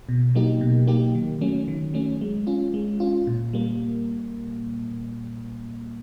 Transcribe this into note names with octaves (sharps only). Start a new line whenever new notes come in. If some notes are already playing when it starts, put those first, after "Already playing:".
B2
F#3 A#3 D#4 G4
B2
F#3 A#3 D#4 G4
D#3
F#3 A3 C#4
D#3
F#3 A3 C#4
G#3
C#4 F4
G#3
C#4 F4
A#2
G3 A#3